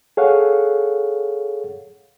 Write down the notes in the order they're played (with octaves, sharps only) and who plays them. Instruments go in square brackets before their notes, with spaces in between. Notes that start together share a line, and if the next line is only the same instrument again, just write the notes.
[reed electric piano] G#4 A4 C#5 F5 F#5